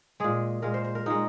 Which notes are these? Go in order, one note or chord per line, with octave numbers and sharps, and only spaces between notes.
A#2 G#3 G#4
A#2 G#3 A#4
C5
C5
A#4
A#2 G#3 D#4